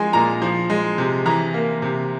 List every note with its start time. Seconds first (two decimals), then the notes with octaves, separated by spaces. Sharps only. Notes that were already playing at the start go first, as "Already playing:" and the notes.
Already playing: F3 G#3 G#5
0.13 A#2 A#5
0.42 F3
0.70 G#3
0.98 C3
1.26 E3 A#5
1.54 A#3
1.82 C3